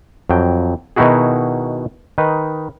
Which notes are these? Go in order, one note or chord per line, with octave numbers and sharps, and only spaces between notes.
F2 F#3 G5
B2 D#3 D#4 E4 F#4 G#4
D#3 D#4 B4